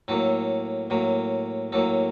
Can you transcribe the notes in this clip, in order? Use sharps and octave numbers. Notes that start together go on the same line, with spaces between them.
A2 F#3 A#3 A4
A2 F#3 A#3
A2 F#3 A#3 A4